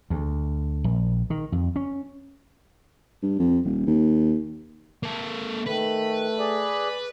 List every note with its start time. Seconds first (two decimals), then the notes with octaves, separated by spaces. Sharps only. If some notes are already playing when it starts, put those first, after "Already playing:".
0.10 D2
0.84 A#1
1.30 D#3
1.52 F2
1.76 C#4
3.23 G2
3.39 F2
3.65 D#1
3.87 D#2
5.03 A#3 A4
5.66 D#3 A3 B4
6.39 G#4 D5